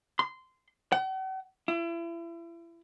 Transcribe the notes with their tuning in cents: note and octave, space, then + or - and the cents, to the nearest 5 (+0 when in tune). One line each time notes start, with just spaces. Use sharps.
C6 -15
F#5 +45
E4 +35